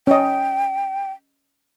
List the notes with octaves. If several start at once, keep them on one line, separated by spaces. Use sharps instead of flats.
C#4 D#5 G5